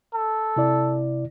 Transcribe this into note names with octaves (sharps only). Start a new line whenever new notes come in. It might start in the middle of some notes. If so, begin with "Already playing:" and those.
A4
C3 E4 D5